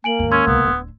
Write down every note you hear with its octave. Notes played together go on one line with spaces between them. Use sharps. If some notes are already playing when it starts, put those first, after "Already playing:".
A#3 G#5 D7 F#7
D#2 G#2
C#4 C6 E6 G#6
C#2 C3 B3
D1 D4